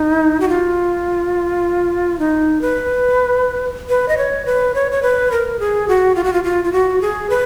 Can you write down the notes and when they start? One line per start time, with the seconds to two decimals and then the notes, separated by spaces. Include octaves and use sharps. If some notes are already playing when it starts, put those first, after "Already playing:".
Already playing: D#4
0.40 F#4
0.49 F4
2.19 D#4
2.61 B4
3.89 B4
4.09 D#5
4.18 C#5
4.46 B4
4.75 C#5
4.92 C#5
5.02 B4
5.32 A#4
5.59 G#4
5.88 F#4
6.15 F4
6.24 F#4
6.33 F4
6.44 F4
6.64 F4
6.73 F#4
7.01 G#4
7.30 B4